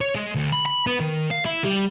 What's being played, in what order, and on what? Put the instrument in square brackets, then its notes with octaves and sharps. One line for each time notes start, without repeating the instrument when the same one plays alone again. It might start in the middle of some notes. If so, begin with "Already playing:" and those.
[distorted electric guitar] C#5
G#3
D2
B5
B5
B3
D#3
F5
E4
G3